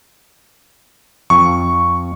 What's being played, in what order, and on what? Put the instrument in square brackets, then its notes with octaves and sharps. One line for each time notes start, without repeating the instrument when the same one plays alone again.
[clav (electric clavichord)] F2 [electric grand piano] C#6